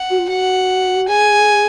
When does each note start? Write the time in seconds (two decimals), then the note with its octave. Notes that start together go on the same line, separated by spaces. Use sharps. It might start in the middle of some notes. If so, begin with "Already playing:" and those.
Already playing: F#5
0.10 F#4
0.19 F4
0.28 F#4 F#5
1.08 G#4 G#5